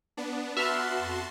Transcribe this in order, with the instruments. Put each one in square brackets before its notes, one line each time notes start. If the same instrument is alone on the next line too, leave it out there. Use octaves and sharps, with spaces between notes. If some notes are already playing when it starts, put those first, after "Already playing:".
[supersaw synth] B3 D4
[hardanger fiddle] B3 D4 [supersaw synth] F#4 A5 C6 [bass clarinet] B4 [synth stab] E5 F6
[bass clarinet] F2